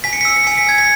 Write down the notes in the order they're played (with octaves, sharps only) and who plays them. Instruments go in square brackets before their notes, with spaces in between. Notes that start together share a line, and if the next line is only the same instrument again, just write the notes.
[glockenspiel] G#5 B6
C#7
B6
E6 C#7
B6
G#5 C#7
B6
E6 G#6
B6